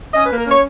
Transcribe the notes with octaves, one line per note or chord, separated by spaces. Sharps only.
C#4 D#5
A#3 B4
A#4
C#4 C#5